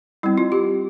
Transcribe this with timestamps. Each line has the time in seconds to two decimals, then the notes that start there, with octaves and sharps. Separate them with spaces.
0.23 G3 C4 E4
0.38 F4
0.52 G4